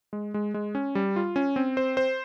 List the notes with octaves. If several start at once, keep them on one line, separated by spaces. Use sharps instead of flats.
G#3
G#3
G#3
C#4
G3
F4
C#4
C4
C5
C5